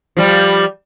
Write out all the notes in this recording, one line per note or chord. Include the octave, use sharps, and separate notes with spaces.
F3 G3